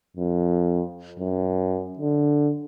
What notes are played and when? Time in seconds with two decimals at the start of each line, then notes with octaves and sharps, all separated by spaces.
0.17 F2
1.20 F#2
1.99 D3